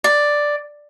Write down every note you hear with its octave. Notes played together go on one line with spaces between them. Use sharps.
D5